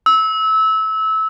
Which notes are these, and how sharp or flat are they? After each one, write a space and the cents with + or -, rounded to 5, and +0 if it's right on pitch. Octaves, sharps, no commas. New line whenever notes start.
E6 -25